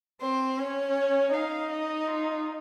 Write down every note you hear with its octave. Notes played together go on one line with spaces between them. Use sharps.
C4 C5
C#4 C#5
D#4 F5
D#5
F4